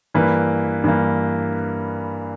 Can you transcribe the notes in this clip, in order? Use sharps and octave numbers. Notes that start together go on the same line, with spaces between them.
G2 E3 A#3 B4
G2 E3 A#3